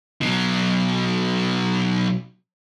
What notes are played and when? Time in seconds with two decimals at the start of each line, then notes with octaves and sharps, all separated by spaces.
0.21 B2 F#3